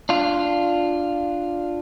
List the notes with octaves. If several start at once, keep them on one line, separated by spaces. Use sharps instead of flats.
D4 F4